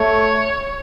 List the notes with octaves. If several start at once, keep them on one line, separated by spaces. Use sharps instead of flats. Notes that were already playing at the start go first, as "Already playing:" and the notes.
Already playing: A3 C#5